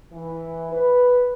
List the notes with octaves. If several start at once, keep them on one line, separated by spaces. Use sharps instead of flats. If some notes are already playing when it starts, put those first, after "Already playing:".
E3
B4